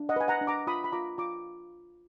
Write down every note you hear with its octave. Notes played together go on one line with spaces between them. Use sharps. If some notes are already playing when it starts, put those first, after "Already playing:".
Already playing: D4
D#5 F#5
B4 G#5
F#5 A#5
D4
A#5 D6
F4 B5 D#6
B5
F4 A#5 D6
F4 A#5 D6